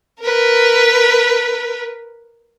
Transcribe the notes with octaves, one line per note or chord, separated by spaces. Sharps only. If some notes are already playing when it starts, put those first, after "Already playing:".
A#4 B4